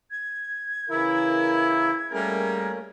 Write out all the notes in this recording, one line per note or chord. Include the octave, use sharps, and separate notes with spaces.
G#6
C#3 E3 E4 A#4
G3 A3 A#3 C#4 G#4 A#4